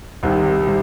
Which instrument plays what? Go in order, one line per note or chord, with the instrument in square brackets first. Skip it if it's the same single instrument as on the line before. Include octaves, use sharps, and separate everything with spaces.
[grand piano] C2 C3 D#3
C3 G3